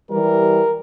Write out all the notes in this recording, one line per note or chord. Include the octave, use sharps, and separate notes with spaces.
E3 G3 A#4